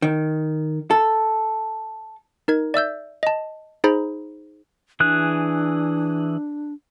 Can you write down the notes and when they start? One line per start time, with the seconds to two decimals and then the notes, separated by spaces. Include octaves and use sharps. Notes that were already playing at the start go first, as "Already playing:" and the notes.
0.02 D#3
0.91 A4
2.48 D#4 A#4 G#6
2.74 D5 E5 E6 G6
3.23 D#5 A5
3.84 D#4 G#4 C5 A#5 B5
5.00 E3 D4 G#4 F#6